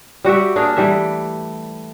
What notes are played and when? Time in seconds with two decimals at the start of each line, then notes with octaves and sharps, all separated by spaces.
0.25 G3 F#4 G4 E5
0.56 A#3 D4 G#4 F5
0.76 E3 G3 A3 E5